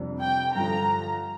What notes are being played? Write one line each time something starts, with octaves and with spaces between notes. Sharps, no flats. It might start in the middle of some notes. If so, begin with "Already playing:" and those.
Already playing: F2 C3 G3 D4
G5
G2 D3 F3 A#5